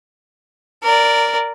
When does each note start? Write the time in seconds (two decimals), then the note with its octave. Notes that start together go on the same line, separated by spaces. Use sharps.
0.83 A#4 D5